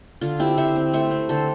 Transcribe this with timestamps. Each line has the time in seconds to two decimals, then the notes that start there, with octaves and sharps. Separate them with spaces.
0.21 D3 F4
0.40 C4 E4 G4
0.57 D3 C5 E5
0.76 C4
0.93 A3 C5 E5
1.11 C4
1.29 D3 A4 C5